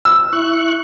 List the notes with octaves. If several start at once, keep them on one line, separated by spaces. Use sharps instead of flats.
E6
E4 C#6 F#6